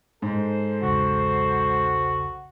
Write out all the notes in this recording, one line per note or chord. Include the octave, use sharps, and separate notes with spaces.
G#2 A4 C5
B1 E2 C#3 F#4